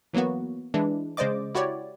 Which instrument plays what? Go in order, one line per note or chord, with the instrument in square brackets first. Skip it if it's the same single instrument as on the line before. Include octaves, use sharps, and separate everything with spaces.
[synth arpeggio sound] E3 F#3 A#3 B3 F#4
E3 G#3 D4 E4
C#3 G#3 C5 D5 D#5 D6
E4 F#4 G4 C#5 D5